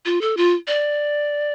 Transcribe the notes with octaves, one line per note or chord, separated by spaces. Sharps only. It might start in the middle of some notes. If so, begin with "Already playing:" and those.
F4
A4
F4
D5